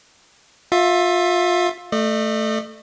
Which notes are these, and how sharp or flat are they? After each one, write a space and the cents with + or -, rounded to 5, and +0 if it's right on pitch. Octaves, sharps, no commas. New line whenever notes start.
F4 +25 E5 +0
A3 +0 D#5 -45